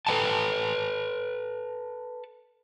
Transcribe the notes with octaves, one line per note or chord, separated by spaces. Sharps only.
A4 B4 D#5 G5 A5